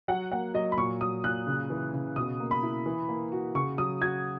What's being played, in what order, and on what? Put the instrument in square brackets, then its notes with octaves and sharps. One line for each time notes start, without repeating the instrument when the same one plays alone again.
[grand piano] F#3 [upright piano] F#5
[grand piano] A#3 [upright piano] F#5
[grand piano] F#3 [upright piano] D#5
[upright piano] B5
[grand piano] A#2 [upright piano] C#6
[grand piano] F#3 [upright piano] D#6
[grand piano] A#2 [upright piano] F#6
[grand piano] C#3
E3
C#3
[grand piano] B2 [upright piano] D#6
[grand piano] A#3
[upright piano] B5
[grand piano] E4
E3
A#3
F#4
[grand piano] C#3 [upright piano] C#6
[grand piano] F#3 [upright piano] D#6
[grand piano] F#4 [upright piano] G#6